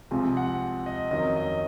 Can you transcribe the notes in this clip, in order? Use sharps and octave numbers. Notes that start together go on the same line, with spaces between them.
C2 C3 F3 G#3 C4
F#5
D#5
F2 D#3 F#3 C#4 D#5
D#5